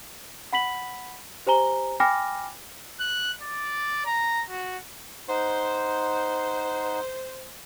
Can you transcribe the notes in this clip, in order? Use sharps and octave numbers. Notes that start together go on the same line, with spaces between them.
F#5 B5 B6 F#7
G4 C5 G#5 A#5 G7
G5 G#5 B5 D6 F6 A#6
F#6
D5
A#5
F#4
D#4 C5 F#5